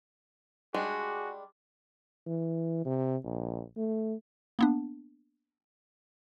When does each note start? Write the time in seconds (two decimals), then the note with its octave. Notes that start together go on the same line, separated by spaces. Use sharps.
0.74 G3 G#3 D4 F#4 G#4
2.27 E3
2.86 C3
3.25 A#1
3.77 A3
4.59 A#3 B3 D4